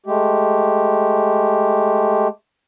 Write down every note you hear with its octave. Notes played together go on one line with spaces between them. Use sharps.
G#3 A3 G4